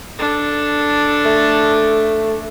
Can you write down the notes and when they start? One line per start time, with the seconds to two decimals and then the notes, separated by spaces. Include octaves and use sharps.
0.19 D4 A4
1.25 A3